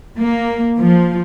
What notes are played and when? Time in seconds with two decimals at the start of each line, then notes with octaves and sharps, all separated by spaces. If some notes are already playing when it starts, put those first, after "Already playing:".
0.20 A#3
0.80 F3